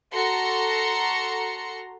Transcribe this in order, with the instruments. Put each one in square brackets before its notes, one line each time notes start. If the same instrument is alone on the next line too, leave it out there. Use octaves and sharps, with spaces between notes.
[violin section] F#4 A4 A#5 C6 C#7